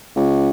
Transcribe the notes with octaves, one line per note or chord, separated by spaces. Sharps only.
C#2